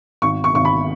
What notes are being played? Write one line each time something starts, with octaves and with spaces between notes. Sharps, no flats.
G#1 C#6
C#6
G#1 C#6
B5